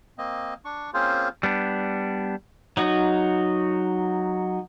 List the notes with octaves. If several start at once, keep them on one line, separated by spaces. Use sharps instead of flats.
A#3 C4 D#5
D4 C#6
A#3 C4 C#4 F4 G#4 C5
G3 B3 D4
F#3 D#4 F#4